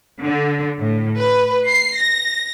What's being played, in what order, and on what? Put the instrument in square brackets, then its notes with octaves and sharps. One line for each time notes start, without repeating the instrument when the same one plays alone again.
[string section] D3
A2
B4
C7
A#6